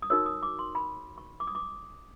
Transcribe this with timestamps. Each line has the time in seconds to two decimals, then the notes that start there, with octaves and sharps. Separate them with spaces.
0.02 D#6
0.10 D#4 F#4 A#4 C#5 E6
0.26 D#6
0.43 D6
0.59 C6
0.75 B5
1.18 C#6
1.40 D6
1.47 D#6
1.55 D6